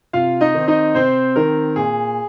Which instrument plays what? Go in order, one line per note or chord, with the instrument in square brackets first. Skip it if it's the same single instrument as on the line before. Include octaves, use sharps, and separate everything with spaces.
[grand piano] C3 F4 F5
D#4 D#5
D#3 C4
D#4 D#5
C3 C4 C5
D#3 C4 A#4
A#2 G#4